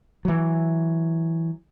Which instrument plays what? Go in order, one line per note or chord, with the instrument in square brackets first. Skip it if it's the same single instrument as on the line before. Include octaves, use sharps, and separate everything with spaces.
[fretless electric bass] E3 F#3